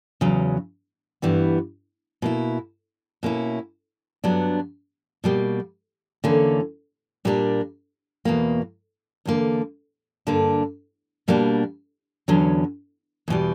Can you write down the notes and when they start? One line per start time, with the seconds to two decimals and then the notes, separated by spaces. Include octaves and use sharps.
0.21 E2 C#3 F#3
1.22 G2 E3 G3 B3
2.22 B2 A#3 E4
3.23 B2 A#3 C#4 E4
4.24 G2 F#3 B3 D4
5.24 B2 G3 A#3
6.24 E2 D3 A#3 C#4
7.25 A#2 G3 A#3 D4
8.25 E2 B2 A#3
9.25 E2 D3 A#3
10.27 G2 D3 A#3 D4
11.28 B2 G3 A#3 D4
12.28 E2 D3 F#3 C#4
13.28 E2 B2 G3